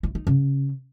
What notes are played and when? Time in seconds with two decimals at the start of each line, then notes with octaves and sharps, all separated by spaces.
0.03 E4
0.15 D#4
0.27 C#3